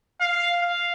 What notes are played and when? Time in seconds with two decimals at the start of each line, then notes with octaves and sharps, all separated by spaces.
0.20 F5
0.62 F5